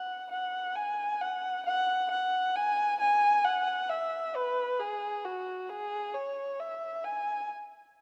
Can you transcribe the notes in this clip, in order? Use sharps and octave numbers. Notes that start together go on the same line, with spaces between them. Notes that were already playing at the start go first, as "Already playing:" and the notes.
Already playing: F#5
F#5
G#5
F#5
F#5
F#5
G#5
G#5
F#5
E5
B4
G#4
F#4
G#4
C#5
E5
G#5